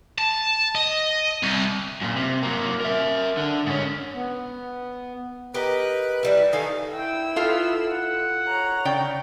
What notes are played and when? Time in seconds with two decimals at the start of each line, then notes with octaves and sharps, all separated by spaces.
0.18 A5
0.75 D#5
1.43 C2
2.02 F#2 A#2
2.16 C3
2.43 F#3 A#3
2.81 A#4 E5
3.37 D3
3.66 G#2 C#4
4.15 B3
5.54 G4 A#4 B4 D#5
6.23 E3 G3 E4
6.53 D#3 D#4 A4 F5 G#5
6.92 E4 G5 E6
7.36 B3 F4 A4 F5
7.87 F#5
8.48 C#5 A#5
8.85 C#3 D5 G5